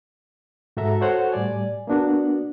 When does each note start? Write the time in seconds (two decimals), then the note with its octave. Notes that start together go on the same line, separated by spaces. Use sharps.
0.77 G#2 F#4 A4 E5 A#5
1.01 F#4 A4 C5 C#5 F#5
1.32 A2 G3 D5 G#5
1.87 A#3 B3 D4 F#4